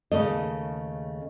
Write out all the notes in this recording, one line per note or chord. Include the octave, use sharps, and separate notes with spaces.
D#2 C#3 E3 A3 D#5